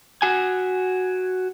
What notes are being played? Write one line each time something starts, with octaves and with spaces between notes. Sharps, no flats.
F#4 G#5